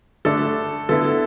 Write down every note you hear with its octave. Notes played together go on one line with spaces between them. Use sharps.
D3 A3 D4 A4
D3 B3 E4 A4